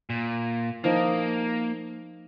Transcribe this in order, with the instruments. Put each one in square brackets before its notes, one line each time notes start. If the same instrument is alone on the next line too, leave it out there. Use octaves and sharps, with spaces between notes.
[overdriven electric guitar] A#2
[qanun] F3 D#4 [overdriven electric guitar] A#3